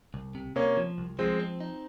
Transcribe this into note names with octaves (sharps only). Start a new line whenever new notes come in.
C2
C3
C3 A#3 C#4
F3
C2
F3 G#3 C4
C4
D#4